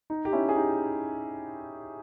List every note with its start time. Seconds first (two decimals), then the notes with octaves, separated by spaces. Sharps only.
0.10 D#4
0.25 G4
0.32 C#4 E4
0.49 G#4
0.56 D#4 G4